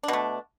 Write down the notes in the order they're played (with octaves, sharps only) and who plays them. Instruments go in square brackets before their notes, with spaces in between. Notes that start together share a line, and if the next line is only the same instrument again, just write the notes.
[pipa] D4
B2
A3